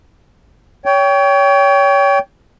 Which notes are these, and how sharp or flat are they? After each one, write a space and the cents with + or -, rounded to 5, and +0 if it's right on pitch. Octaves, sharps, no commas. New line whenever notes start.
C#5 +30 G5 +0